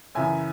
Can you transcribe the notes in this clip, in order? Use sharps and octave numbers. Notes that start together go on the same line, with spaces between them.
F#2 C#3 E3 E5 G#5